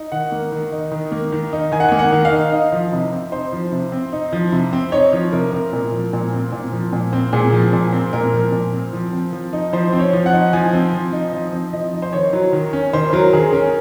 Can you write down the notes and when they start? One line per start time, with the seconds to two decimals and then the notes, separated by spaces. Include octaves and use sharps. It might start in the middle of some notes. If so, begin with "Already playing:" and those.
Already playing: D#4
0.12 D#3 F#5
0.32 A#3
0.52 D#3
0.72 D#4
0.91 D#3
1.12 A#3
1.32 D#3
1.53 D#4
1.72 D#3 G#5
1.80 F#5
1.88 A#3 G#5
1.99 F#5
2.12 D#3
2.25 F5
2.32 D#4
2.52 D#4 D#5
2.72 F3
2.92 C3 D#5
3.13 C4
3.32 D#4 C5
3.53 F3
3.72 C3
3.92 C4
4.12 D#4
4.33 F3
4.52 C3
4.73 C4
4.92 D#4 C#5
5.13 F3
5.32 C3 A#4
5.52 C4 A#4
5.73 A#2
5.92 F3
6.13 A#2
6.32 C4
6.52 A#2
6.72 F3
6.93 A#2
7.13 C4
7.33 A#2 G#4
7.53 F3
7.73 A#2
7.92 C4
8.13 A#2 A#4
8.32 F3
8.52 A#2
8.73 C4
8.93 F3
9.13 C4
9.33 F3
9.53 D#4
9.73 F3 C5
9.93 C4
9.99 C#5
10.13 F3
10.26 F#5
10.33 D#4
10.53 F3 G#5
10.74 C4
10.93 F3
11.13 D#4
11.32 F3 D#5
11.53 C4
11.73 F3 D#5
11.93 D#4
12.02 C5
12.13 D#3 C#5
12.33 F#3
12.53 D#3
12.73 C#4
12.93 D#3 C5
13.13 F#3 A#4
13.33 D#3 G#4
13.53 C#4 A#4